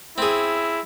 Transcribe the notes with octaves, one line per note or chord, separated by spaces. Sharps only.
C4 E4 G#4